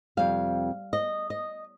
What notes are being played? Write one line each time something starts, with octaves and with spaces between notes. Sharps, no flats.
F2 C3 G3 F5
D#5
D#5